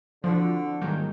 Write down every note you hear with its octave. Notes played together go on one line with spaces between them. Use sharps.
D3 F3 C4 E4 F#4
G#2 D#3 F#3 G3 A#3 G6